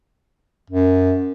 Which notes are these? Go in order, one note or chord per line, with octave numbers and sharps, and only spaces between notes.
F#2